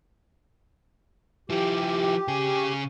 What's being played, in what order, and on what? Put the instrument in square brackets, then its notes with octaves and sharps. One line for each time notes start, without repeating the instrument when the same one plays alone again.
[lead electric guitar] F3 E4 [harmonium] G4
[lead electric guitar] C#3 G#4